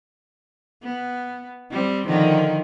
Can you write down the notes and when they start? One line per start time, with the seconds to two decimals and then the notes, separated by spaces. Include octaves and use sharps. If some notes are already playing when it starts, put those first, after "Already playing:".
0.82 B3
1.71 G3 C4
2.06 D3 D#3 F3